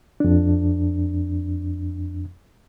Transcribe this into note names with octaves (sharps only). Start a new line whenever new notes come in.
F2 D4